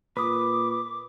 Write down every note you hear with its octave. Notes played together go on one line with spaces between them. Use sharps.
A#2 B4 D6 D#6